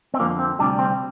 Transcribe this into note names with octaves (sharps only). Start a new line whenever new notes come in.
C4
F2 D3 F3 A#3
C4
D2 C3 G3 D4
C4